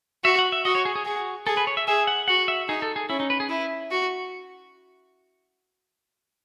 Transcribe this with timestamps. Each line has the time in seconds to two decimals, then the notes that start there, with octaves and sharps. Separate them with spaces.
0.24 F#4 E5
0.39 F#5
0.52 E5
0.65 F#4 D#5
0.75 C#5
0.85 G#4
0.95 G#4
1.06 F#4 G#4
1.46 G#4 A4
1.57 B4
1.67 C#5
1.77 E5
1.88 G#4 E5
2.07 F#5
2.28 F#4 F#5
2.48 E5
2.69 D#4 G#4
2.82 A4
2.96 G#4
3.10 C#4 E4
3.20 D#4
3.30 B4
3.40 G#4
3.50 E4 B4
3.91 F#4